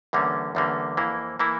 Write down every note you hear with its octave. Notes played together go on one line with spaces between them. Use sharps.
E2 D3 G3 A#3 C#4
E2 D3 G3 A#3 C#4
F2 E3 A#3 E4
E3 A#3 E4